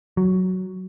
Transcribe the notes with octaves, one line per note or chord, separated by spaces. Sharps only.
F#3